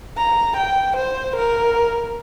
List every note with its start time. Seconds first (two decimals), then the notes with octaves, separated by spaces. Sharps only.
0.18 A#5
0.57 G5
0.97 C5
1.36 A#4